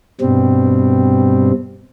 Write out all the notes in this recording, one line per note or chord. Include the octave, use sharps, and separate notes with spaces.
G2 B2 G3 C4